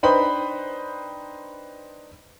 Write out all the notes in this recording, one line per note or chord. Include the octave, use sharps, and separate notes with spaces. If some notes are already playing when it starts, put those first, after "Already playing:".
D4 D#4 B4 C5 G5 B5